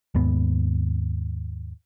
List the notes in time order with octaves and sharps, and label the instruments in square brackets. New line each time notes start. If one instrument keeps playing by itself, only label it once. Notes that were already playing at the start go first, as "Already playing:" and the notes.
[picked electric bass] D#2 G#2 B3